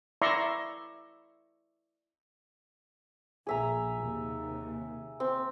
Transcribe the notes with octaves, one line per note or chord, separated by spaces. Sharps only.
E4 D5 E5 A#5 C6 C#6
A#1 G#4 E5 A#5
D#2 C3
C4